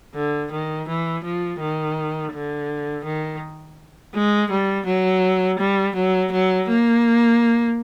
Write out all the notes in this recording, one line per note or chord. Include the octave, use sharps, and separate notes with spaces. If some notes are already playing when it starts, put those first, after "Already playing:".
D3
D#3
E3
F3
D#3
D3
D#3
G#3
G3
F#3
G3
F#3
F#3
A#3